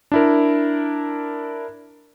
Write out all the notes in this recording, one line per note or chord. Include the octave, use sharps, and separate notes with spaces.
D4 E4 A#4